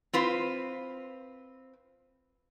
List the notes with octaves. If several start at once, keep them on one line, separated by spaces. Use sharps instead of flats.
C4 F4 B4